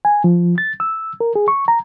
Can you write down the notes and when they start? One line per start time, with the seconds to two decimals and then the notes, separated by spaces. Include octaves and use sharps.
0.05 G#5
0.24 F3
0.58 A6
0.80 E6
1.21 A#4
1.36 G#4
1.48 C#6
1.68 A#5